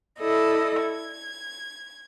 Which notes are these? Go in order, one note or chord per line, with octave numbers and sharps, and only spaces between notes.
E4 A4 D5 D#5
G#6